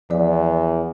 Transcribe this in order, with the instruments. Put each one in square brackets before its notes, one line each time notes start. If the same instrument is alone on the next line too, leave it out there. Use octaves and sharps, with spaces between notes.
[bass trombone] E2 [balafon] F3 D5